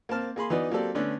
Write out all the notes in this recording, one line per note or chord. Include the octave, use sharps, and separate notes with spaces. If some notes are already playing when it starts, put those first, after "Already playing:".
A#3 C4 A5 F6
A#3 G#4 B5 C6
E3 B3 D#4 F#4 B4 D5
F#3 A#3 C4 G4 A4 D5
D3 A3 B3 C#4 D4